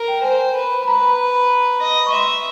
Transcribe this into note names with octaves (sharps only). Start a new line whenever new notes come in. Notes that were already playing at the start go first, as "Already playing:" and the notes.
Already playing: A#4
G5
C5 G#5
B4
B5
B4 A#5
D#5
C#6
E5 C6